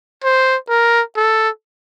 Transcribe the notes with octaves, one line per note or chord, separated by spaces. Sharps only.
C5
A#4
A4